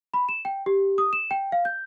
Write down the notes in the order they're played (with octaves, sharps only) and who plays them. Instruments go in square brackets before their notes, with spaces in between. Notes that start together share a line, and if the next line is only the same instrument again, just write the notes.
[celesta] B5
E7
G5
G4
D#6
E7
G5
F5
G6